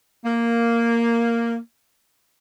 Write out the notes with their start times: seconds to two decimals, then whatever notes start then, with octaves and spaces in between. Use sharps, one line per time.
0.25 A#3